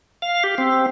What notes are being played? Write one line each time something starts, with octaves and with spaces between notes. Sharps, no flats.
F5
G4
C4